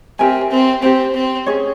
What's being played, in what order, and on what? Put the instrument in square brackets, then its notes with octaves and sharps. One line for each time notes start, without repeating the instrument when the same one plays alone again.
[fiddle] C4 [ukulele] G4 A#4 E5 G#5
[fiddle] C4
[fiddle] C4 [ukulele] G4 C5 G5
[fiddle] C4
[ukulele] C#4 F4 G#4 C#5